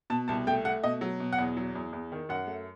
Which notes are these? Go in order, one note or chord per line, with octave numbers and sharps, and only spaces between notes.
B2 A5
C2 A5
A3 G5
A3 F#5
B2 D#5
F#3
B2
F#5
E2
F#3
E2
E2
D#3
F#2 F#5
A3